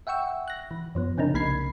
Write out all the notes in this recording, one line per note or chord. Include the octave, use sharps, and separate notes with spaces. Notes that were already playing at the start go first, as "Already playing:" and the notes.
E5 F#5 G5 C#6 E6
F#6 A#6
E3
F#2 F3 B3
C#3 C4 D4 D#4 A#4
C2 A#3 B5 G#6 C7